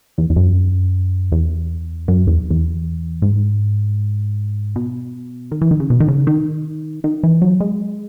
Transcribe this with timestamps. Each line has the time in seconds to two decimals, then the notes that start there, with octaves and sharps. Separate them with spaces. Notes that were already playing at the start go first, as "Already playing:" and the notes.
0.18 E2
0.30 E2
0.36 F#2
1.32 E2
2.08 F#2
2.27 E2
2.50 E2
3.22 G#2
4.76 B2
5.51 D#3
5.61 E3
5.71 D#3
5.80 C#3
5.90 B2
6.00 D#3
6.08 C#3
6.27 D#3
7.04 D#3
7.23 E3
7.42 F#3
7.60 G#3